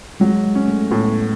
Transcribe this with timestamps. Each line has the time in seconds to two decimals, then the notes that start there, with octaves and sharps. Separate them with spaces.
0.20 F#3 G#3
0.45 G#3
0.55 C#4
0.68 A3
0.91 A2 B3